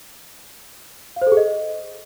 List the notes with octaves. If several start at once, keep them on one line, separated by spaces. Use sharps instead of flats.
F5
C5
A4
G#4
D#5